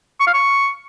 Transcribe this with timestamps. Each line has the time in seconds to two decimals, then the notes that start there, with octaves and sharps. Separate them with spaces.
0.20 C#6
0.27 F5
0.34 C#6